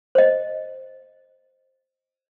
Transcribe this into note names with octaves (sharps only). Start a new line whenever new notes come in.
C5 D#5